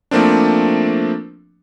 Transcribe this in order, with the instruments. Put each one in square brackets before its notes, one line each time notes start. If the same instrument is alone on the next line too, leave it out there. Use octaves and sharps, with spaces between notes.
[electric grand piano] F3 A3 A#3 C4 D4